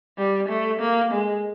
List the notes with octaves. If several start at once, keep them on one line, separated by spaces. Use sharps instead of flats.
G3
A3
A#3
G#3